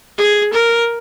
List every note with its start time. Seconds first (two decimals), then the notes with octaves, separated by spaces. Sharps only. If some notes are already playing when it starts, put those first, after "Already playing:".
0.18 G#4
0.53 A#4